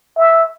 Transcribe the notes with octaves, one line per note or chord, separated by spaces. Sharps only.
E5